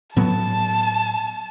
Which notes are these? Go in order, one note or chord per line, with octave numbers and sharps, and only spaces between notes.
A2 F#3 B3 A5